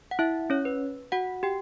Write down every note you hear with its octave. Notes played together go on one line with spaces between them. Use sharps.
F#5
E4 E5
C#4 C#5
B4
F#4 F#5
G4 G5